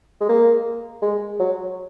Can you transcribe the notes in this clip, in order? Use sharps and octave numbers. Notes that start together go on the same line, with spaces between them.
G#3
A#3
G#3
F#3